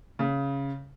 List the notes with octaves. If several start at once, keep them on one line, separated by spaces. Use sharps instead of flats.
C#3